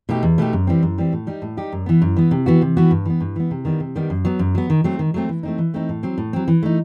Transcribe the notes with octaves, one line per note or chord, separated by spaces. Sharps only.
B2 A3 D#4 G4
E2
B2 A3 D#4 G4
F#2
E3 G3 C4
F#2
E3 G3 C4
A2
G3 D#4 G4
A2
G3 D#4 G4
F#2
E3 B3
F#2
E3 B3
C3
E3 B3 F#4
C3
E3 B3 F#4
G2
E3 B3
G2
E3 B3
C3
D#3 G3 B3
C3
D#3 G3 B3
F#2
F#3 B3
F#2
F#3 B3
D#3
F#3 A3 C4
D#3
F#3 A3 C4
E3
A3 C4 D#4
E3
A3 C4 D#4
A2
F#3 C4
A2
F#3 C4
E3
A3 D#4